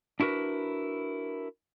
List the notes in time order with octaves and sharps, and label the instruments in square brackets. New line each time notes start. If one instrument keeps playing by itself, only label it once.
[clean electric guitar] D4 E4 F#4 A#4 B4